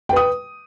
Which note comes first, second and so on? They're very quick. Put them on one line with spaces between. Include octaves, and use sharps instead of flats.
G5 B4 D#6